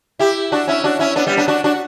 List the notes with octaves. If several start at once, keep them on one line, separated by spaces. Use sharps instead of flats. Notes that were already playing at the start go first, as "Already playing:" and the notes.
E4 G4
D4 F#4
C#4 E4
D4 F#4
C#4 E4
B3 D4
G3 B3
B3 D4
D4 F#4
D4 F#4